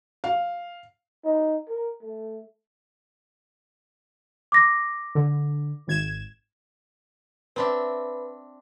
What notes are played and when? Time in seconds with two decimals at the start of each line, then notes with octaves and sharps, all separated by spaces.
0.24 F5
1.24 D#4
1.69 A#4
2.03 A3
4.52 D6 A#6
5.15 D3
5.87 G#1 G#6 E7
7.56 C4 D4 B4 E5 B5